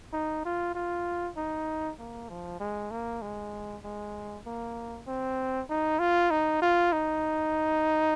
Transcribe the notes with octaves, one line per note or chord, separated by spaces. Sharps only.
D#4
F4
F4
D#4
A#3
F3
G#3
A#3
G#3
G#3
A#3
C4
D#4
F4
D#4
F4
D#4